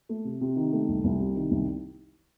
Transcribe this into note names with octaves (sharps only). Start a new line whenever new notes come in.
A3
C3
C3
D#3
A3
C2
C2
C3
D#3
C2